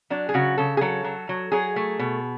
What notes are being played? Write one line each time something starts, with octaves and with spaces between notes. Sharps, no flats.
F#3 D4
G#4
C#3 F#4
C#3 A4
G#4
F#3 A4
F#3
F#3
F#3 G#4
A3
B2